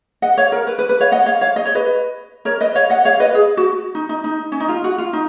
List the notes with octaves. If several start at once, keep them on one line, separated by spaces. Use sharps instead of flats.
D#5 F#5
C#5 F5
A#4
B4
B4
B4
C#5 F5
D#5 F#5
C#5 F5
C#5 F5
D#5
C#5
B4 D#5
A#4 C#5
B4 D#5
C#5 F5
D#5 F#5
C#5 F5
B4 D#5
G#4
F#4
D#4
D#4
D#4
C#4
D#4
F4
F#4
F4
D#4